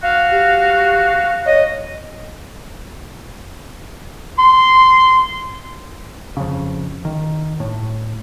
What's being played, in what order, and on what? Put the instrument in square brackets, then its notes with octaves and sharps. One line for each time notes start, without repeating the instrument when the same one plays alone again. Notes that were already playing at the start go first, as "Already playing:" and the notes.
[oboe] F#4 [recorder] F5
[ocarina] G4
[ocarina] C#5 [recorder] D#5
[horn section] C6
[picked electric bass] F2 C#3
D#3
A2